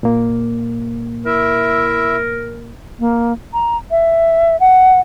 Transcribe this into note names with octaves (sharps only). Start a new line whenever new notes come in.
A#2 A#3
E4 A#4 E5
A#3
A#5
E5
F#5